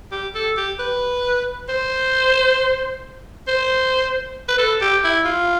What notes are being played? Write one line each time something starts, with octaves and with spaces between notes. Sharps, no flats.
G4
A4
G4
B4
C5
C5
B4
A4
G4
E4
F4